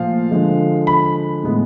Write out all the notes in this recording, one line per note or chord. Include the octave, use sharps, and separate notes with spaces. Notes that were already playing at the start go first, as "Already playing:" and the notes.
Already playing: A#2 F3 A3 F5
D3 F3 G#3
B5
A2 E3 G#3 B3